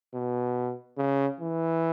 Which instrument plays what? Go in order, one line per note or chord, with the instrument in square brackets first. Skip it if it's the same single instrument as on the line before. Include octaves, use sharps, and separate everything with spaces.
[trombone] B2
C#3
E3